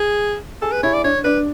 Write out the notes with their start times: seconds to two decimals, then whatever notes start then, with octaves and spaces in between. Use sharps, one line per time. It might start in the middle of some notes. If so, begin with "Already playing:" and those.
Already playing: G#4
0.62 G#4 A4
0.72 B4
0.83 E4 C#5
0.93 D5
1.04 D4 C#5
1.24 D4 B4